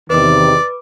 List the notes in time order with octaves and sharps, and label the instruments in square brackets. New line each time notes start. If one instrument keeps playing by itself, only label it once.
[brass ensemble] E2 C3 D#3 [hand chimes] B4 D6 [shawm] D5